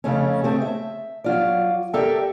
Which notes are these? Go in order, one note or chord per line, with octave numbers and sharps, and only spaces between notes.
F2 C#3 A3 C#4
A3 C4 G#4
E5
F#3 F4 D5
G4 A4 A#4 D5 E5 G5